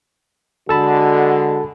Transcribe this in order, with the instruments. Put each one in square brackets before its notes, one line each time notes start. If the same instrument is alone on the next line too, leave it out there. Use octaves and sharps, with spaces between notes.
[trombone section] D3 G#3 [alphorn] F#4 [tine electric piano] A4 A5 B5